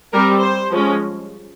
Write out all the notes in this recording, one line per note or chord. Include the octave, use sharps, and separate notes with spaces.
G3 C4 A#4
C5
F3 G#3 C#4